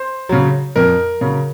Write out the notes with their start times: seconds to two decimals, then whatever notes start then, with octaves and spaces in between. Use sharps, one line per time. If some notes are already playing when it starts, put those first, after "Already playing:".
Already playing: C5
0.29 C#3 F#3
0.76 F2 A#4
1.21 C#3 F#3